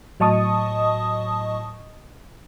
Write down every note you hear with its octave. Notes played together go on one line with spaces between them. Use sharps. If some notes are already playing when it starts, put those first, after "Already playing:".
A2 F#3 D#5 A5 C#6 D#6